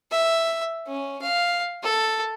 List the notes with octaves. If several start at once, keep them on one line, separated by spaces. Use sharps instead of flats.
E5
C#4
F5
A4